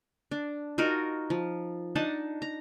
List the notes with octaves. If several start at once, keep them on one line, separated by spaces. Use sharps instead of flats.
D4
D#4 F4 F#4 A#4
F3
D4 D#4 F#5 A5
A#5